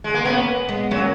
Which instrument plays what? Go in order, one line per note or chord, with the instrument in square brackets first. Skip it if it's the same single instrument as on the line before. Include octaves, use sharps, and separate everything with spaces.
[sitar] G#3
A#3
[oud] A#3 C#4 [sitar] B3
[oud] G#3 B3
[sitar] F#3 [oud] A#3 C#4